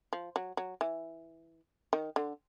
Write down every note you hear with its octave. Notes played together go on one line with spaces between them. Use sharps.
F3
F#3
F#3
E3
D#3
D3